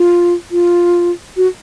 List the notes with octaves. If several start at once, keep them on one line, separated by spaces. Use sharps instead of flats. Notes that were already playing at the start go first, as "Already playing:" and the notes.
Already playing: F4
F4
F#4